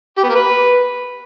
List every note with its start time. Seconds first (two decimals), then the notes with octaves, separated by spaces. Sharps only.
0.18 G4
0.23 B3
0.29 A#3
0.35 B4